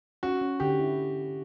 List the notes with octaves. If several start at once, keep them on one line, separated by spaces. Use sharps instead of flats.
C#4 F#4
C#4
D3 G4
E4